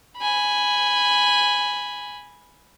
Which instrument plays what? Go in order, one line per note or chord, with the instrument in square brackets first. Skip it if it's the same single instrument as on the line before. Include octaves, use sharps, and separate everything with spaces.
[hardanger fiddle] G#5 B5